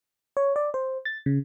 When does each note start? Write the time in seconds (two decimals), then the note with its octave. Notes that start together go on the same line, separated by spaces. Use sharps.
0.37 C#5
0.56 D5
0.74 C5
1.05 A6
1.26 C#3